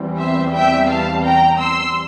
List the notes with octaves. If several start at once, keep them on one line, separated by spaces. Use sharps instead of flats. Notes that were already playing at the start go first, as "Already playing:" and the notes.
Already playing: E2 E3 G3 C4
C5 E5
E5 G5
F5 A5
G5 A#5
C6 E6